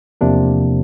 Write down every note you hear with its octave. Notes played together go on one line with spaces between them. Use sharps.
E2 C3 F3 A#3 D4